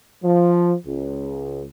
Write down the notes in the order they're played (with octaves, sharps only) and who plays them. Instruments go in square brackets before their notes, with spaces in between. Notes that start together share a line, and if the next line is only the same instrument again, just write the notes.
[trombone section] F3
C#2